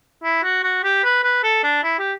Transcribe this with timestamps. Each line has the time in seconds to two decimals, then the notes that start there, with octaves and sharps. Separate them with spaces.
0.23 E4
0.43 F#4
0.63 F#4
0.83 G4
1.04 B4
1.23 B4
1.43 A4
1.63 D4
1.83 E4
1.99 G4